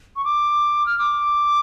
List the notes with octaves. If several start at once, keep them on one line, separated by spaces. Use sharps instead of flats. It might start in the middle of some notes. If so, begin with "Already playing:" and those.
C#6
D6
F6
D6